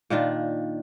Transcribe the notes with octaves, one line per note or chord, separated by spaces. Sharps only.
A#2 D#3 D4 F4